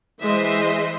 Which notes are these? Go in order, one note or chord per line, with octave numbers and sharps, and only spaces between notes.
E3 G#3 C5 D#5 E5 C6